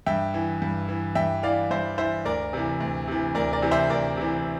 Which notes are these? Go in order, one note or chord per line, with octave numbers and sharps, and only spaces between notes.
G2 E5 G5
E3
G2
E3
G2 E5 G5
E3 D5 F5
G2 C5 E5
E3 C5 E5
D2 A#4 D5
C3 E3
D2
C3 E3
D2 A#4 D5
A#4 D5
C3 E3
C5 E5
D2 A#4 D5
C3 E3